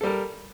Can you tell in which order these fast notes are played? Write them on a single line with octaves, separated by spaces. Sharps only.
A4 G3 A#4